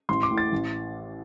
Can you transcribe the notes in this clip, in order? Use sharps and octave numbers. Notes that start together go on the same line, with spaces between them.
A1 C6
D6
A2
A6
A1